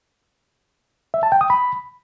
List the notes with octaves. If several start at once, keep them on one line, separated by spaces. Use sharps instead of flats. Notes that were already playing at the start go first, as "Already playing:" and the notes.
E5
A5
G5
D#6
B5